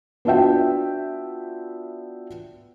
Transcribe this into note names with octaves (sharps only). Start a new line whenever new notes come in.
B3 D4 F4 F#4 E5 G5